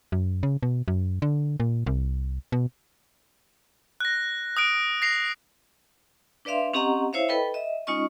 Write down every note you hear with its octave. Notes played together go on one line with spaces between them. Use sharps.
F#2
C#3
B2
F#2
D3
A#2
C2
B2
F#6 A#6
D#6 F#6 D7
A#6 C7 F7
D4 B4 D5 E5 F5 C6
C4 C#4 G4 D#5 F#5 A#5
E4 C5 C#5 E5 F5
A4 B4 D#5 G5 B5
D#5 E5
G#3 C#4 D#4 F4 D#5 C#6